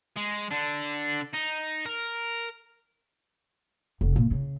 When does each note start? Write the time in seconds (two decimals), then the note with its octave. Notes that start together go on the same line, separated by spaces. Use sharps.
0.16 G#3
0.51 D3 D4
1.34 D#4
1.86 A#4
4.01 F1
4.16 A#2
4.31 C#3